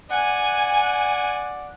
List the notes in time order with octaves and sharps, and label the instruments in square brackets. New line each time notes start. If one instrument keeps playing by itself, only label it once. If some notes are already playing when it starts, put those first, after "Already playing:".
[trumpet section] D5 F#5 [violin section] G#5